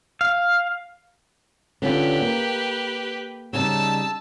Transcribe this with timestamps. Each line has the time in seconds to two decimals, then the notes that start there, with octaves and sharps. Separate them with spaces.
0.21 F5
1.82 D3 C#4 F4 G4 B4
2.21 A#3
3.53 C#3 G3 D#4 A5 E6